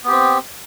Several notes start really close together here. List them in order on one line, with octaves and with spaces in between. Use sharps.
B3 G4 C4